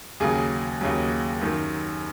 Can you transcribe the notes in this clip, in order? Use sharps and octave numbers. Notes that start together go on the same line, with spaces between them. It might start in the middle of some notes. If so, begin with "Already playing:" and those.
D#2 C#3 F#3 G#4
D#2 C#3 F#3
F#2 D#3 F#3